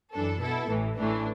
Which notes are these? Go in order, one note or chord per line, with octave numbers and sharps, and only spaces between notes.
F#2 E3 D4 A4
B2 B3 E4 A4
A1 A2 E3
A1 A2 E3 A3 D4